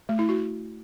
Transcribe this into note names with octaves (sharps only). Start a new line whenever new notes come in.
A3
E4
F#4